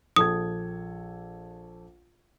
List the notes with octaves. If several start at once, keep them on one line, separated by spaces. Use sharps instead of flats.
A#1 A4 D#6 G#6